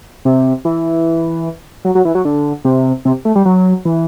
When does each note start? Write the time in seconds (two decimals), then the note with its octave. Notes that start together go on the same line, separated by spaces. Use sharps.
0.25 C3
0.65 E3
1.85 F#3
1.95 F#3
2.05 E3
2.15 F#3
2.25 D3
2.65 C3
3.05 C3
3.25 A3
3.35 G3
3.45 F#3
3.85 E3